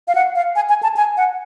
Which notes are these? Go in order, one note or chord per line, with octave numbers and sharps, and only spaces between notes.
F5
F#5
F5
G#5
G#5
A5
G#5
F#5